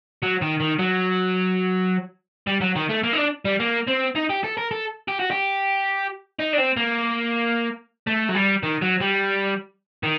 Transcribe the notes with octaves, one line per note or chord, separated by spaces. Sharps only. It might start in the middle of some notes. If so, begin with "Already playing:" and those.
F#3
D#3
D#3
F#3
G3
F#3
D#3
A3
A#3
D#4
D4
G3
A#3
C4
D#4
G4
A4
A#4
A4
G4
F#4
G4
D#4
D4
C4
A#3
A3
F#3
G3
D#3
F#3
G3
D#3